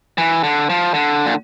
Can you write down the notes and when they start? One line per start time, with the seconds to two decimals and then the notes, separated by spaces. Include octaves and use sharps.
0.18 E3
0.44 D3
0.70 F3
0.94 D3
1.26 A#2